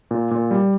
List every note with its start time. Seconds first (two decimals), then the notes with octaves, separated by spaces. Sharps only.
0.11 A#2
0.31 A#2
0.51 G3